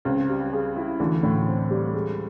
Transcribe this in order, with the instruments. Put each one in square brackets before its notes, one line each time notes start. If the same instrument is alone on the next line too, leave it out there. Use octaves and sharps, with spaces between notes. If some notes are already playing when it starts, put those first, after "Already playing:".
[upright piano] C#2 C#3 [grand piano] C4
[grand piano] G3
G#4
E4
[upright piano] D2 D3 [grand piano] E3
[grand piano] A2
C4
G3
G#3